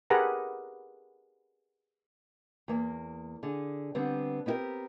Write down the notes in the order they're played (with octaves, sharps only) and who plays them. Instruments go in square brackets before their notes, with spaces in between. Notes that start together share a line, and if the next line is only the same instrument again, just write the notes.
[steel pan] G4 G#4 A#4 B4 F#5 A#5
[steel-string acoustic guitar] E2 A#3
D3 G#4
D3 G3 B3 C4
B3 C4 E4 G4 A#4